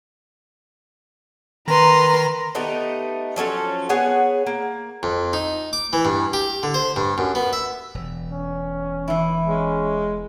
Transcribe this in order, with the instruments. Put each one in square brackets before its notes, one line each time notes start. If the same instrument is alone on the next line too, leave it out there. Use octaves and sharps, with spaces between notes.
[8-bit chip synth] D#3 A#6 [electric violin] B4 C6 [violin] A#5
[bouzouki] A3 B3 D#4 G4
F3 F#3 C#4 A4
B3 G#4 C#5 F#5
A#3
[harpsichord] F2
D#4
D6
E3
G2
G4
D3
C5
G2
F#2
B3
E5
[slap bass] E1
[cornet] C#4
[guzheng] E3 E4
[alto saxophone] G#3 [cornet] C#4